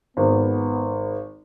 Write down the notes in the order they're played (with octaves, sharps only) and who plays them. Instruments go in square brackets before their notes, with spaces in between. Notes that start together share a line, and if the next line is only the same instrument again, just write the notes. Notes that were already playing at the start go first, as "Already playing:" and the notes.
[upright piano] G#1 [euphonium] B3